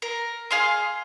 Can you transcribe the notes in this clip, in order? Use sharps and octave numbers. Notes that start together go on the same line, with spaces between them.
A#4
G#4 F5 C6